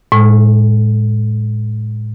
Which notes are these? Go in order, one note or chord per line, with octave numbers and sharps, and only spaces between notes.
A2 G#3